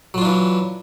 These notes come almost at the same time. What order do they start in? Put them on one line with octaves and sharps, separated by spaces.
F#3 F4 D4 E3